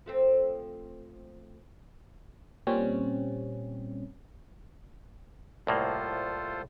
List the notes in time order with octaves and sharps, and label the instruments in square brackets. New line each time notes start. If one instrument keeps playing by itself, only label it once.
[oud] F3 A3 C4
[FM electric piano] A#2 G3 C4 C#4
[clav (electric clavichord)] C2 A2 A#3 [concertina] F4 A4 C5